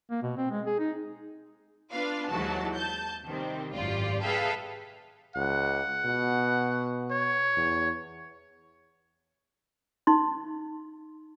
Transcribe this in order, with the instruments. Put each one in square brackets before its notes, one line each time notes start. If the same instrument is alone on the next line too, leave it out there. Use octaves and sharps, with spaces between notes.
[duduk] A#3
B2
C4
G#3
G#4
D#4
[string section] B3 D4 F4 B4 F5
D#2 G#2 E3 F#3 F#4 A5
A5 G6
C3 D#3 G3 C4
G#1 F#2 A2 F4 G4 D5
G#4 A4 B4 E5 F5 G5
[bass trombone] C#2 [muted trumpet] F#5
[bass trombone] B2
[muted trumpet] C#5
[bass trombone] E2
[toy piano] D#4 C6